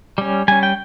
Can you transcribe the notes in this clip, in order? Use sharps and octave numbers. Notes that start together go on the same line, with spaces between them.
G3 C#4
G3 C#4 G#5
G5